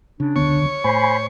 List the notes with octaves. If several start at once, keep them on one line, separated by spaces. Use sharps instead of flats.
C#3 D4
E1 C#2 D3 B3 C#5
A2 C5 G#5 B5